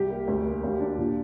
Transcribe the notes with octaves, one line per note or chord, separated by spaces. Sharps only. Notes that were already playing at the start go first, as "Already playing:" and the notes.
Already playing: C2 G4
A#3
D2
A#3
D#2
D4
A#2